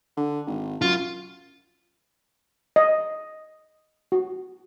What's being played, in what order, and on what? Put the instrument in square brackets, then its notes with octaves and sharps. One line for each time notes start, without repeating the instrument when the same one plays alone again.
[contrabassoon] D3
G#1
[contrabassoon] F#2 [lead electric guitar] F4
[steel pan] D#5
F#4